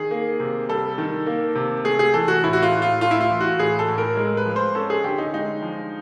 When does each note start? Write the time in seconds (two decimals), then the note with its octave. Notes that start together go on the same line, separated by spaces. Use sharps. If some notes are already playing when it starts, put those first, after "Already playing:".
Already playing: D#3 G#4
0.11 A#3
0.40 C3
0.69 G3 A4
0.98 D#3
1.27 A#3
1.55 C3
1.84 A3 G#4
1.99 G#4
2.14 E3 A4
2.28 F#4
2.44 A2 E4
2.53 F#4
2.63 F4
2.72 A2
2.82 F4
3.01 A3 F4
3.11 E4
3.21 F4
3.31 E3
3.41 F#4
3.59 A2 G#4
3.79 A4
3.88 A2
3.98 A#4
4.17 G#3 A#4
4.37 B4
4.46 F3
4.56 C5
4.75 C#4 A4
4.90 G#4
5.04 D3 G4
5.18 D#4
5.33 G#3 D#4
5.62 F3